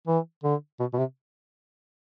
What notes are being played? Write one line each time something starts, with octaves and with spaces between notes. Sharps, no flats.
E3
D3
B2
B2
C3